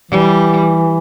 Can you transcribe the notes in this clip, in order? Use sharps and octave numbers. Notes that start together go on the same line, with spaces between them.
E3 G3